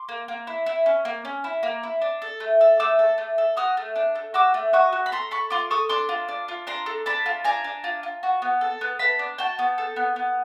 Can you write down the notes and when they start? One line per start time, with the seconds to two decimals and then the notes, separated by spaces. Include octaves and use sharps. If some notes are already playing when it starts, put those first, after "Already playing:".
Already playing: C6 D6
0.09 A#3
0.28 A#3
0.47 E4
0.66 E4
0.86 C#4
1.05 A#3
1.25 C#4
1.44 E4
1.63 A#3
1.83 E4
2.02 D4
2.22 A4
2.40 A3
2.61 A4
2.80 A3 D6 E6
2.99 A4
3.18 A3
3.38 A4
3.57 F#4 D#6 F6
3.77 A3
3.96 D4
4.15 A3
4.34 F#4 D6 E6
4.54 A3
4.73 F#4 C#6 D#6
4.93 F#4
5.06 B5
5.12 A4 A#5 C6
5.31 A4 B5 C#6
5.50 F4 C6 D6
5.70 A4 C#6 D#6
5.89 D4 C6 D6
6.09 F4
6.28 D4
6.48 F4
6.67 D4 A#5 C6
6.86 A4
7.06 D4 A5 B5
7.26 F4
7.44 D4 G#5 A#5
7.64 D4
7.84 F4
8.03 F4
8.23 F#4
8.42 B3
8.61 A4
8.81 B3
8.99 B3 A5 B5
9.19 D4
9.38 F#4 G5 A5
9.59 B3
9.78 A4
9.96 B3
10.16 B3